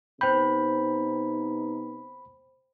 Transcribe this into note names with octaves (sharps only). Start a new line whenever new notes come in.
C3 B3 D#4 C5 G5 B5 G6